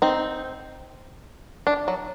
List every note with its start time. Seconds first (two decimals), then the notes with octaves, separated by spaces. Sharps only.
0.02 C4 D#4
1.67 D4
1.88 F#3